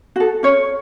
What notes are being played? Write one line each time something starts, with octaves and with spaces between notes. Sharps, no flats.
F#4 A4
C#4 C#5